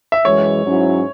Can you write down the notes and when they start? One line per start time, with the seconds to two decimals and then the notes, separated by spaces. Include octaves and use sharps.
0.12 E5
0.25 F#2 E3 G#3 C#5
0.64 G#2 F#3 C#4 E4